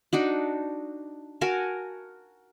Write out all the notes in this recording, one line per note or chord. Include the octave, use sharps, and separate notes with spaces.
D4 D#4 F#4
F#4 A#4 G#5 A5